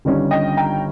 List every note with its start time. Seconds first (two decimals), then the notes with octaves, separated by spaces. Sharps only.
0.05 G1 G2 D#3 G3 C#4
0.31 D#5 G5
0.57 G5 A#5